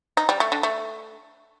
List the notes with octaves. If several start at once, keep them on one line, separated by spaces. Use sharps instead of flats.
D#4
G3
A3
D3
A3